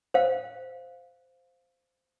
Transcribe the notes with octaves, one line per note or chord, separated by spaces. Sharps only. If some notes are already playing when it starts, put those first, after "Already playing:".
C5 F5